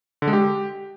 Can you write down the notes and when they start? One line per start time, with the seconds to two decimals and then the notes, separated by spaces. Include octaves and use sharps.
0.22 D3
0.28 G#3
0.33 G4